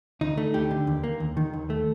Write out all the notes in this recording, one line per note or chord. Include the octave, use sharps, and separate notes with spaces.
D2 D#4
A3
D2 G4
D3
D#2
A#3
D#2
D#3
D#2
A3